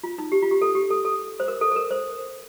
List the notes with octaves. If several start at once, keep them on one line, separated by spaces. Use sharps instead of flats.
F4
D#4
G4
F4
G4
A4
G4
A4
A4
C5
A#4
A4
A4
A#4
C5